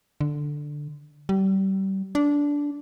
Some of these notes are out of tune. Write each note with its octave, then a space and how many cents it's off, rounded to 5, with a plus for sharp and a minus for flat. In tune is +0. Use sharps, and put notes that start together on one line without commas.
D3 +5
G3 -30
D4 -15